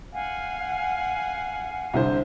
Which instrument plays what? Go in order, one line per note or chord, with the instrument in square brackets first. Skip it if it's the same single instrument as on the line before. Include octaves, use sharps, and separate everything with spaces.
[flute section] F5 F#5 G#5
[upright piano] C2 D3 C5